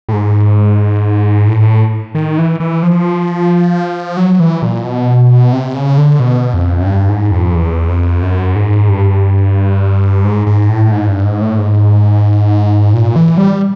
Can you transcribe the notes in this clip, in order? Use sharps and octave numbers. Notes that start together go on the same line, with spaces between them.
A2
G#2
A2
D#3
E3
E3
F3
F#3
E3
A#2
B2
C3
C#3
D3
B2
F2
F#2
G2
G#2
F2
E2
F2
F#2
G#2
G2
G#2
G#2
A2
G#2
G2
G#2
A2
G#2
A#2
E3
G3